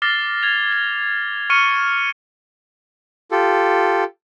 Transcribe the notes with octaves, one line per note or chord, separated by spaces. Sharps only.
D6 F6 A6 A#6 C7 G7
G#6 F7
G7
C#6 F6 C#7 D#7 G7
F4 G4 A4